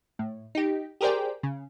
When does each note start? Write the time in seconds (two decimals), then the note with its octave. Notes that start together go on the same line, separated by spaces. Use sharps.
0.19 A2
0.55 D#4 G4
1.01 G4 G#4 A#4 C5 D5 G5
1.43 C#3